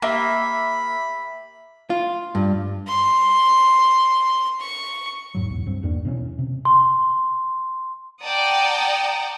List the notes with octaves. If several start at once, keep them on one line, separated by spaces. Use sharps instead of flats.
A#3 G4 E5 B5 G7
F4
G2
C6
C#6
E2 G#2 F#3
B1 E2
G2 C4
A#1 E2 A#3 D4
B2 E3 C4 C#4
C3
C6
D5 F#5 G5 A5 A#5 D#6